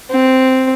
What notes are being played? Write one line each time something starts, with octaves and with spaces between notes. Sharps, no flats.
C4